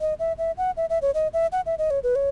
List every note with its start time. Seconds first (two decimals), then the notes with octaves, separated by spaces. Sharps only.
0.01 D#5
0.19 E5
0.38 E5
0.58 F#5
0.77 E5
0.90 E5
1.02 C#5
1.14 D#5
1.33 E5
1.52 F#5
1.66 E5
1.78 D#5
1.90 C#5
2.03 B4
2.16 C#5